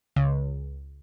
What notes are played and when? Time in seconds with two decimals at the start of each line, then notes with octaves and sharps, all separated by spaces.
0.16 C#2